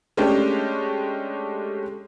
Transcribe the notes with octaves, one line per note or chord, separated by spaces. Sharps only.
G#3 A3 C#4 D4 G4